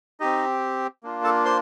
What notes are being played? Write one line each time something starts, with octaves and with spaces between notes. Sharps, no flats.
C4 D#4 G4 D#5
A#3 D4 F4
A4 A5
C5 C6